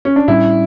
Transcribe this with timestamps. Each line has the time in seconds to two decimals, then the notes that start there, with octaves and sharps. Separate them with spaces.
0.05 C#4
0.16 D4
0.28 A2 G3 C#4 E4